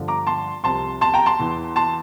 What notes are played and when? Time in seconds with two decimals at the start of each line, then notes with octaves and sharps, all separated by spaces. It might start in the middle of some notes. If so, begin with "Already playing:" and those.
Already playing: G2 D3 F3
0.08 A#5 D6
0.27 A5 C6
0.63 C2 C3 F3 A5 C6
1.01 A5 C6
1.14 G5 A#5
1.26 A5 C6
1.39 E2 E3
1.76 A5 C6